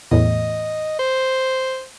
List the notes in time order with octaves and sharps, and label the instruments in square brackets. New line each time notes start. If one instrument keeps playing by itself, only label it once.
[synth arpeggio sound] E2 A2 [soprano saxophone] D#5
[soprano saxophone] C5